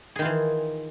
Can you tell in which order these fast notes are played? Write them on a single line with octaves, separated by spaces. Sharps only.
G#4 D#3 F4 E3